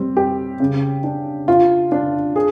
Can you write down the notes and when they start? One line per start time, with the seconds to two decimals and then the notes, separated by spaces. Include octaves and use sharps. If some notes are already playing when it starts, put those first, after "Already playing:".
Already playing: G3 C4
0.17 G4
0.60 C#3
1.04 D4
1.48 F4
1.92 D4
2.36 G#4